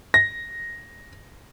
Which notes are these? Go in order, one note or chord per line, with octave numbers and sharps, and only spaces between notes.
A#6